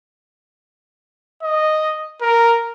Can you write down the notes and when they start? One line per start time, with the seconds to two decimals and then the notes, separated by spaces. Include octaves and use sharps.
1.43 D#5
2.22 A#4